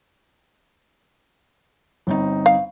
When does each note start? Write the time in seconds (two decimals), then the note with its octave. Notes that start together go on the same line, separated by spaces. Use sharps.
2.07 G1 C4 D#4
2.46 F5